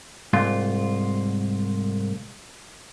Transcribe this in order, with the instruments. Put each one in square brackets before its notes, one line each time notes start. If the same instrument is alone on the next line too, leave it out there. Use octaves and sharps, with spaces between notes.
[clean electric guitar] C2 G#2 F4